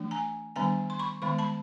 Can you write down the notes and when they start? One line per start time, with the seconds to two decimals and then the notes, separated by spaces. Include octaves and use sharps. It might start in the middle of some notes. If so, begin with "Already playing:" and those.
Already playing: E3 A3 D4
0.11 G#5 A#5
0.56 D#3 G3 B3 D4 G#5 A#5
0.90 C6
0.99 B5 C#6
1.22 D#3 G#3 B3 B5 C#6
1.38 A5 B5